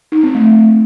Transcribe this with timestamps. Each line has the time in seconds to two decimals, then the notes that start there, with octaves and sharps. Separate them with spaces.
0.12 D#4
0.23 C4
0.35 A3